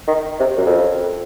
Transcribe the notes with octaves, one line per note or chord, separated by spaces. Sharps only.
D#3
C3
F#2
F2